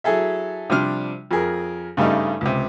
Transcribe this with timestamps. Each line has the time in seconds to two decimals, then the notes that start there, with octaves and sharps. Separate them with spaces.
0.04 F#3 E4 G#4 A4 E5
0.70 C3 F3 G3 D4 F6
1.31 F2 G#4 A#4
1.97 G2 C#3 G3 A3 D#4
2.41 C#2 C3